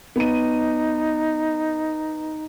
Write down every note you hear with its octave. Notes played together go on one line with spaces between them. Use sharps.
B3 D#4 D#7